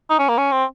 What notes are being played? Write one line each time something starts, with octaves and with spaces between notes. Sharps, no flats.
D#4
C#4
A#3
C#4
C4